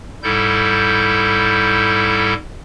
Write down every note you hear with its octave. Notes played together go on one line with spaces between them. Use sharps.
G#2 G3 E4 A4 G6